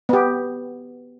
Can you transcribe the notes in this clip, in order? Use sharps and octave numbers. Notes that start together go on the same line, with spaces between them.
B3 G4